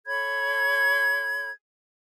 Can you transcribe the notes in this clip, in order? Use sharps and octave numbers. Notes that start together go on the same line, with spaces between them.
A4 C#5 B5 G#6